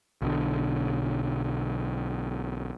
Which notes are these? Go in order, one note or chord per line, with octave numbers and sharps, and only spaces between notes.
B1 B2 D3